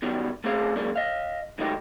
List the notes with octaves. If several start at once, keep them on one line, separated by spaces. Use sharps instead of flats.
B2 D#3 F#3 G3 B3
A3 C4 C#4 G#4 F5
F#2 G#3 A#3 D4
D#5 F5
G#2 D#3 F#3 A3 D#4 G4